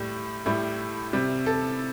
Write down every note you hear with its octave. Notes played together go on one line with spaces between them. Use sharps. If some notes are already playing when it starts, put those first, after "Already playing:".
Already playing: A2 G3
A2 G3 E4
C3 G3
A4